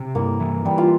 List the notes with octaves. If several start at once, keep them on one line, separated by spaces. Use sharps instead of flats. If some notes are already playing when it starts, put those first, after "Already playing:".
Already playing: C3
G2 A#3
E3
E3 G3
F4